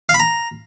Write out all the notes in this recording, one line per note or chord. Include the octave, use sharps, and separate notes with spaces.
F5
B5
A#5